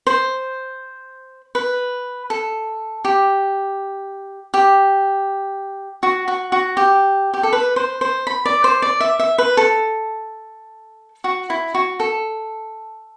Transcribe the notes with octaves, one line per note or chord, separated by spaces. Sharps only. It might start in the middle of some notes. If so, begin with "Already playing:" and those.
C5
B4
A4
G4
G4
F#4
F#4
F#4
G4
G4
A4
B4
C5
C5
B5
D5
C5
D5
E5
E5
B4
A4
F#4
E4
F#4
A4